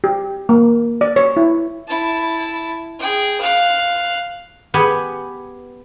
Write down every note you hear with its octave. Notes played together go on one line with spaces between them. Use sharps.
G4
A#3
D5
C#5
E4
E4 A5
G#4 G5
F5 F#6
B3 G4 G#5 B5